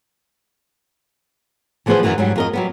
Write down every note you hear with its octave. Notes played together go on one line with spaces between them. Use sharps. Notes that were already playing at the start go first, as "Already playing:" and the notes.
E3 F3 B3 G#4 B4 C5
F#2 A#2 D#3 E3 F#4
G#2 F#3 G3
F2 A#4 D#5
F#3 G3 B3